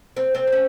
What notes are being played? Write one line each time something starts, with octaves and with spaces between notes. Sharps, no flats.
C4
C4
C4
C#4